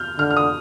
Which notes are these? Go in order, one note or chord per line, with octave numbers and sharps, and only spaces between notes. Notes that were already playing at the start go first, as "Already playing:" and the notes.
Already playing: F6 G6
D3 F6
F6
D#6